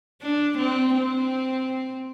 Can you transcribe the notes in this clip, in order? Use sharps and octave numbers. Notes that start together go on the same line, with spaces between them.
D4
C4
C4